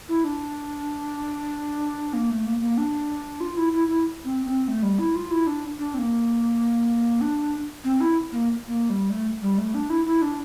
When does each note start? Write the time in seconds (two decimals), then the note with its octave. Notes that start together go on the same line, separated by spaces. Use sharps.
0.09 E4
0.24 D4
2.13 A#3
2.30 A3
2.46 A#3
2.61 A#3
2.78 D4
3.40 F4
3.57 E4
3.73 E4
3.88 E4
4.25 C4
4.46 C4
4.68 A3
4.83 G3
4.99 E4
5.15 F4
5.31 E4
5.47 D4
5.79 D4
5.94 C4
5.98 A#3
7.21 D4
7.84 C4
8.01 E4
8.32 A#3
8.68 A#3
8.90 G3
9.10 A3
9.42 G3
9.58 A3
9.74 D4
9.90 E4
10.06 E4
10.22 D4